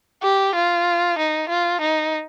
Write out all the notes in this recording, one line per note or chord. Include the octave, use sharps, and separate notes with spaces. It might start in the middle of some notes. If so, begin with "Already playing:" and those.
G4
F4
D#4
F4
D#4